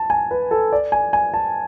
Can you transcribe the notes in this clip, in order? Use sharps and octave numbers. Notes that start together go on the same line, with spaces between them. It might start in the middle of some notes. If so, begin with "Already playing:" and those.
Already playing: A5
G#5
B4
A4
D5
G#5
G#5
A5